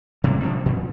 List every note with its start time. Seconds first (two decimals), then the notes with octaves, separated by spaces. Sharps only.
0.24 C3 G3 G#3 A#3
0.43 D2 F3 G3 D4
0.66 A#2